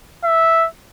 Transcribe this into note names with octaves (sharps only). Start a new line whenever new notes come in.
E5